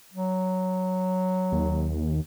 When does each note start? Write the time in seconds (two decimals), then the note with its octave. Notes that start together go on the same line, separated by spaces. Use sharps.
0.14 F#3
1.52 D#2